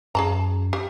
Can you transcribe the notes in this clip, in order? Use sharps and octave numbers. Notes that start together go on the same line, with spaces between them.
F#2 G#4 A5 A#5
G4